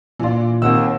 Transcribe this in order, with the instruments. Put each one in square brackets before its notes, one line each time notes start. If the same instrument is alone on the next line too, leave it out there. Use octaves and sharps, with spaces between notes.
[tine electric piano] A#2 F4 [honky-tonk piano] E3 D4
[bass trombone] D#2 [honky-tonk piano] D#3 C4 [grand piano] F#5 E6